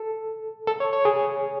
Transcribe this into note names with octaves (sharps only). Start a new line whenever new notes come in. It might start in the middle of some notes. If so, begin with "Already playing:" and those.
Already playing: A4
A4
C#5
C#5
G#4